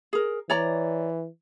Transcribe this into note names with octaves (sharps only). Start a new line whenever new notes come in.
G#4 A#4
E3 C#5 D5 A#5